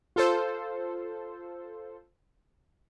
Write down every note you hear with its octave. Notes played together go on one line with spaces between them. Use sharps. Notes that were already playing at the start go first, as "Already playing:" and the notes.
F4 A4 C5